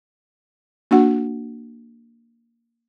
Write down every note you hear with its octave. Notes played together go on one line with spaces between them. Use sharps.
A#3 D4 F#4 F#5